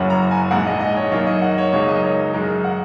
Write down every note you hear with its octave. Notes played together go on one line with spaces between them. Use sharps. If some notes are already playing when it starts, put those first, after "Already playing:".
Already playing: F#1 F#2 F#3 C#4 F#5
A#5
G#5
A#1 G#2 G#3 F#5
D#5
D#5
C#5
F#2 D#3 A#3 C#5
D#5
F#5
C#5
C#2 C#3 F#3 A#3 D#4 C#5
D#5
C#5
F#2 D#3 G#3 D#4 A#4
F#5